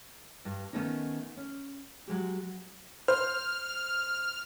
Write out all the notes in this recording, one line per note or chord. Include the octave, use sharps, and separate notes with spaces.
G2
D#3 A3 B3 C#4 D#4
C#4
F#3 G#3 G4
C5 F6